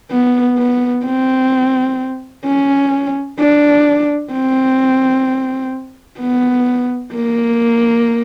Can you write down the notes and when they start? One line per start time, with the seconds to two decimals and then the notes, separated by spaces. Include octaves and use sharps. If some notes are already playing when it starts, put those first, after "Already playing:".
0.11 B3
0.58 B3
1.05 C4
2.45 C#4
3.39 D4
4.33 C4
6.20 B3
7.13 A#3